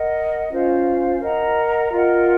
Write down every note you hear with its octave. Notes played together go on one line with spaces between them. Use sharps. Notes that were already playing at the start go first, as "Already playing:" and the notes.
Already playing: A#4 D#5 F#5
C#4 F4 C5 F5
A#4 D#5 F#5 A#5
F4 A#4 D#5 F#5